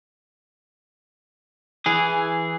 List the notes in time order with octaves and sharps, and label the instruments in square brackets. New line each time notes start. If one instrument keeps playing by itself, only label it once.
[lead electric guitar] E3 G#4